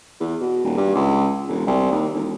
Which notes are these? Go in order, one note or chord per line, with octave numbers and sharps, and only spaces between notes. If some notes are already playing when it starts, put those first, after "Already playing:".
E2
B2
D#1
G2
C#2
E1
C2
D#2
E1